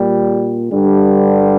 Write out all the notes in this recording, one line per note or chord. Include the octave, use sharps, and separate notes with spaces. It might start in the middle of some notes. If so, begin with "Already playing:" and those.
Already playing: A#2 G3
G2 D3 G3